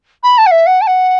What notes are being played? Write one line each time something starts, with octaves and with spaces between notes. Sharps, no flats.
B5
A5
F#5
E5
F#5
A5
F#5